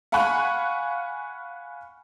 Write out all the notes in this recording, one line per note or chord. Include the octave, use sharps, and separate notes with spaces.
F5 F#5 G#5 B5 C#6 F#6